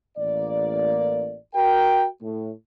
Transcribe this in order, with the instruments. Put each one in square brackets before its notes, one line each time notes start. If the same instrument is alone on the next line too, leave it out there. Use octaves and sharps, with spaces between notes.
[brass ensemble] A1 A#3 D5
F#4 A#4 G5
A2